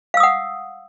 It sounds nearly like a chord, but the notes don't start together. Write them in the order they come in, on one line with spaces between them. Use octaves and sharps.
F5 E6 D#6 F#5